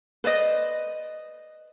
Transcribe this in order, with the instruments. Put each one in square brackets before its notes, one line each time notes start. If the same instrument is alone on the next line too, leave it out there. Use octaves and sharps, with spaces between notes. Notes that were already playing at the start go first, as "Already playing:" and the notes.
[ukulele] B4 C5 D5 D#5